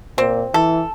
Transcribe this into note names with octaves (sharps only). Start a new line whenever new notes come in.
A#2 C4
E3 A4